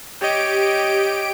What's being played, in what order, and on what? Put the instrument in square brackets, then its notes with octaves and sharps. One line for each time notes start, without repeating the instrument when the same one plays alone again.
[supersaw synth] G4 D7 [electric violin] C#5 D#5